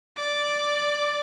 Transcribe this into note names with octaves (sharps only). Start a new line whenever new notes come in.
D5 D6